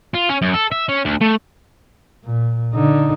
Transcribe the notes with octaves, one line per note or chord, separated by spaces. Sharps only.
F4
C#4
F#2
A4
E5
C#4
D2
A3
A#2
D3 D#4